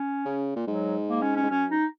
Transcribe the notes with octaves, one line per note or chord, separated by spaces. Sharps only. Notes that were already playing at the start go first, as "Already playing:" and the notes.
Already playing: C#4
C#3
A#2
G#2 F#3
A#3
C#4
C#4
G#2
F#2 C#4
D#4